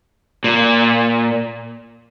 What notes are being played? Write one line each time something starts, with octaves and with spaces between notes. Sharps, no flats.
A#2